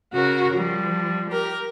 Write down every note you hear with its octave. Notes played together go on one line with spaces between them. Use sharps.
C#3 F#4 A#4
F3 G3
G4 A#4